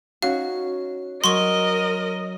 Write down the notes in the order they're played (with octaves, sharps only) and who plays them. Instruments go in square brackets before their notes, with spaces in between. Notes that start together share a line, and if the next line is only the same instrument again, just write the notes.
[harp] C#4 D#4 F#4 [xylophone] F5
[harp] F#3 [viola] A#4 D#5 [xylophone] C6 C#6